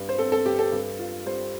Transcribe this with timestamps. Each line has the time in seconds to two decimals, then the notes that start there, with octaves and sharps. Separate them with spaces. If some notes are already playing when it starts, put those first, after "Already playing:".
Already playing: G2 G3
0.09 C5
0.18 C4 A4
0.32 A4
0.45 G2 G4
0.59 A4
0.72 G2
0.99 F4
1.26 G3 C5